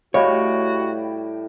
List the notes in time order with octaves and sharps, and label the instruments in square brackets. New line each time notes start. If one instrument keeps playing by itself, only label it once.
[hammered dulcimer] A2 G3 G5 [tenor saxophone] F#4 [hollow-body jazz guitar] C#5 [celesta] D#5 F5 B5